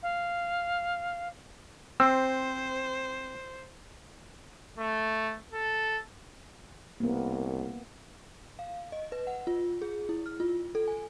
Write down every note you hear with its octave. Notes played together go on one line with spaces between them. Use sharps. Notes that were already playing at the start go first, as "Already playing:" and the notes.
F5
C4 C5 E6
A3
A4
C2 A#3 B3
F5
D#5
B4
F#5
F4
G#4
E4
F6
F4
A4
G#5